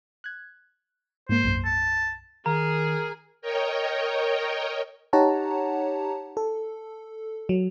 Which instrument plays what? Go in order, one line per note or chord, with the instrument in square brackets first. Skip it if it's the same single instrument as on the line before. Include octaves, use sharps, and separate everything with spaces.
[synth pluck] F#6 G#6
[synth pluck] G#2 A#3 [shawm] C5
[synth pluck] B1 F#2
[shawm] A5
[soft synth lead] D#3 [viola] G#4 [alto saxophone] A#4 [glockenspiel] A#5
[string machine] A#4 C#5 D#5 G5
[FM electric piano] D#4 G4 C#5 F#5 A5 A#5
A4
F#3